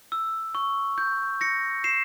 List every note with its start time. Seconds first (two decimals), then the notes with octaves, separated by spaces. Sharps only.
0.12 E6
0.55 C#6
0.98 G6
1.41 A#6 C#7
1.84 C7 E7